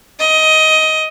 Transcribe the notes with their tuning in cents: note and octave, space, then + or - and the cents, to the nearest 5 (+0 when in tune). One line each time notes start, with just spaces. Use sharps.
D#5 +15